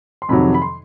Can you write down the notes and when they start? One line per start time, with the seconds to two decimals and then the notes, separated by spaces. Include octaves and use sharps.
0.22 C6
0.29 F2 C3 D#3 F#3 B5
0.54 B5
0.62 C6